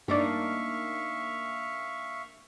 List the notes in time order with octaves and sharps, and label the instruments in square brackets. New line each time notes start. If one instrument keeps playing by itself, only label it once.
[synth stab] G2 D5 [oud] A#3 D4 D#4 [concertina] E5 F5 C#6